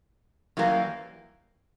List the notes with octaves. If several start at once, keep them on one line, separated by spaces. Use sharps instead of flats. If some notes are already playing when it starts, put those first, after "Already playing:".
F#2 E3 G3 A#3